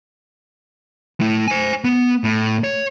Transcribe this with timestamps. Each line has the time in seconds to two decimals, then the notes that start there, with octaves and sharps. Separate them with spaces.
1.20 A3 E4
1.48 C5 G#5
1.84 B3
2.24 A2
2.64 C#5